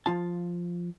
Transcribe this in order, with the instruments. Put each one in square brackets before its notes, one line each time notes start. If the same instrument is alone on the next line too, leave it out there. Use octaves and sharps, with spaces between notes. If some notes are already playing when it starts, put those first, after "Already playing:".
[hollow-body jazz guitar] F3 F4 A5